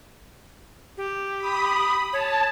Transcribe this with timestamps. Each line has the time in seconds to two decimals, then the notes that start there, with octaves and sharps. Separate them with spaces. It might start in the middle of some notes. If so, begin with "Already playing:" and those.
0.97 G4
1.37 B5 D#6
2.13 C#5 A5